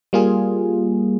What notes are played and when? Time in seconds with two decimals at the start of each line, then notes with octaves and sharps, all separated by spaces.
0.13 G3 A#3 F4 G#4